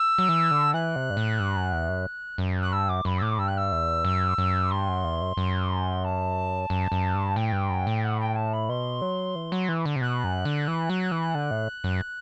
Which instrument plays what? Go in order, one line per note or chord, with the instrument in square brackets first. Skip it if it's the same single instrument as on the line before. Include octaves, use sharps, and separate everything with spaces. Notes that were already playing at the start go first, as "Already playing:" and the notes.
Already playing: [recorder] E6
[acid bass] F#3
E3
D3
[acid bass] E3 [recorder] F#6
[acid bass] C3
G2
A2
G2
F#2
E2
F#2
F#2
[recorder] F#6
[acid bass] G2 [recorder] E6
[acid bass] F#2 [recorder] D6
[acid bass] F#2 [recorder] B5
[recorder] E6
[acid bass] A2 [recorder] D6
[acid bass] G2 [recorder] E6
[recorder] F#6
E6
[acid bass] E2
F#2
F#2
[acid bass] G2 [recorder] C6
[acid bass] F#2
E2
F#2
F#2
[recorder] A5
[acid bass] F#2
F#2
G2
[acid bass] A2 [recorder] G5
[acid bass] G2
F#2
A2
[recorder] F#5
G5
A5
B5
[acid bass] B2 [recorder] C6
[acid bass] F#3
E3
F#3
E3
D3
C3
[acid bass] B2 [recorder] F#6
[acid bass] F#2
D3
E3
F#3
E3
D3
A2
F#2